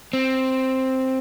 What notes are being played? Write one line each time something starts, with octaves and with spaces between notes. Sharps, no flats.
C4